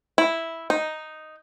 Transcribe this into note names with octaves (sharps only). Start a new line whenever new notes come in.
E4
D#4